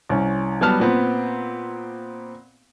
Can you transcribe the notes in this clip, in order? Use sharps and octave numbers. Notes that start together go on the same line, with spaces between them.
C2 C#4
F#3 G3 B3 A5 F6
A#2 B3 C4